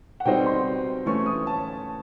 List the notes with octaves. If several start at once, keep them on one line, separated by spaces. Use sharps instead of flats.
F#5
B2 G3 C4 D#4 G5
C6
E3 A3 C#4 C#6
D#6
A5